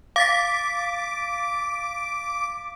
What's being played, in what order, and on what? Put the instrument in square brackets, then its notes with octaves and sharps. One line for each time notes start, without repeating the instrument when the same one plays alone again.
[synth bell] F5 A6 B6 [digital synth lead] D6